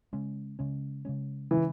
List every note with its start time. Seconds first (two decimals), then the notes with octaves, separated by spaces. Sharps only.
0.13 C#3 G#3 C#4
0.59 C#3 G#3 C#4
1.05 C#3 G#3 C#4
1.51 C#3 E3 G#3 C#4